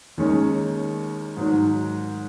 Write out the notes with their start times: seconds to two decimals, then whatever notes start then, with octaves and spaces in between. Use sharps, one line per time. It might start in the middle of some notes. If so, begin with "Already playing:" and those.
0.18 D#2 D#3 G#3 C#4
1.37 G#2 D#3 F#3